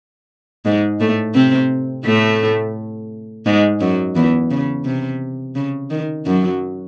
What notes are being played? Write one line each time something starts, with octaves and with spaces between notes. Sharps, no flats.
G#2 G#3
A2 A3
C3 C4
A2 A3
G#2 G#3
F#2 F#3
E2 E3
C#3
C3
C#3
D#3
F#2 F#3